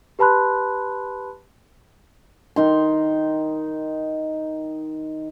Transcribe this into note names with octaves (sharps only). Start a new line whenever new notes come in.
G4 B4 A5 B5 C6 F#6
D#3 D#4 C6